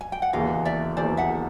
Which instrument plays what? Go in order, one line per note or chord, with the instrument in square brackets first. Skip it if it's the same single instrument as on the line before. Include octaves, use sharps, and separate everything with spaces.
[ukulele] G#5
G5
F#5
[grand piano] E1 D#2 C#3 E3 [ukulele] D#5 F5
[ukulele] D5 E5
[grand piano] E1 D#2 C#3 E3 [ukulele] C5 D5
[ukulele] E5 F#5